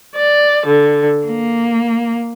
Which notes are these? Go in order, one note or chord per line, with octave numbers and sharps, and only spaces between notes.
D5
D3
A#3